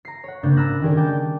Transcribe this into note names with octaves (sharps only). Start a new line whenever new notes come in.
A#5 C7
C#5 F#5
G#1 C#3 A#3 D4 G6 A6
A#5 B5 E6 F#6 A6 A#6
D#3 G3 G#4 A#4 D5
G5 A5 D6 G6 A6